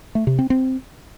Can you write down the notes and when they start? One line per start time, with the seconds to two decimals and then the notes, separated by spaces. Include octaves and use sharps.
0.15 A3
0.27 C3
0.39 C4
0.50 C4